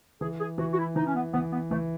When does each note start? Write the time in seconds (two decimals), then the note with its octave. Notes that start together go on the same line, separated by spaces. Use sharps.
0.21 E3 G#4
0.39 G#4
0.58 E3 F#4
0.73 F#4
0.77 E4
0.96 E3 D#4
1.06 C#4
1.14 B3
1.33 E3 B3
1.52 B3
1.71 E3 A3